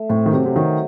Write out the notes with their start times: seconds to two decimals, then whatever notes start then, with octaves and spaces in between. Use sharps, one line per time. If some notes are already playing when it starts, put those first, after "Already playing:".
Already playing: A3
0.10 A2 C4
0.26 D#3
0.33 C3 F#3
0.46 C3
0.56 D#3 F#3